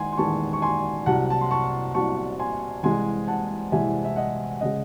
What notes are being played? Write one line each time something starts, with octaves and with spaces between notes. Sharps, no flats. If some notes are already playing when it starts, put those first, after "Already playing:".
Already playing: D#3 G#3 F#5 G#5 C6
C6
E2 D#3 G#3 A5 C#6
C#6
G#5 C6
C2 C3 F#3 F#5 A5
A5
C6
A5 C#6
C2 C3 F#3 A5 C#6
G#5 C6
C2 C3 E3 G#3 G#5 C6
F#5 A5
C2 C3 E3 G#3 E5 G#5
E5
D#5 F#5
C#3 G#3 D#5 F#5